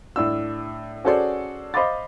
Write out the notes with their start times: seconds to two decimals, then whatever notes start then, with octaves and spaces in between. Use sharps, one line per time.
0.16 A2 D4 E6
1.05 C#4 F#4 G#4 A4 C5 D5
1.74 C5 D#5 F5 B5 D6 A6